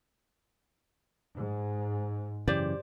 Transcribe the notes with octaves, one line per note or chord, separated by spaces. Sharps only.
G#2
F#2 C#3 E3 G4 C5 D5